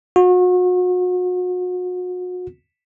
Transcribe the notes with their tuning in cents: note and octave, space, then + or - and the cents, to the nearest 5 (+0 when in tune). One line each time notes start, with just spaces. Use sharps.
F#4 -35